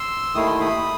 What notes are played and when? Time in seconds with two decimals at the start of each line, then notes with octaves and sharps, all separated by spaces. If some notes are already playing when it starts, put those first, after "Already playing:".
Already playing: C6 E6
0.34 D#2 D#3 A3 E4 D#6
0.47 C6
0.60 B5 D#6